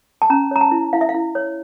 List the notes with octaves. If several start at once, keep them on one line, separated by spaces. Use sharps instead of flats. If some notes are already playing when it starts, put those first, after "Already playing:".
A5
C#4 A#5
C#5 A#5
A5
E4
E4 F5
E5
F5
E4
C#5